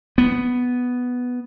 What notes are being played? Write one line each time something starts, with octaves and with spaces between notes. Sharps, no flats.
B3